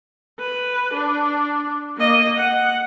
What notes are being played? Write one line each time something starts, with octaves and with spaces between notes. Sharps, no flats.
B4
D4
A#3 D#5
F#5